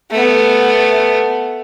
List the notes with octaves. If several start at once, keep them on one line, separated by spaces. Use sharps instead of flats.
A3 B3